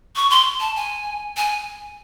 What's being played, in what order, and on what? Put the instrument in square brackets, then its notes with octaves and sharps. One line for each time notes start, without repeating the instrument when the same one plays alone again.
[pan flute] C#6
C6
A5
G#5
G#5